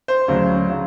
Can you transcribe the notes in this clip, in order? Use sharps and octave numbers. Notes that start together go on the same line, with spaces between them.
C5
D2 C#3 F#3
C#3 F#3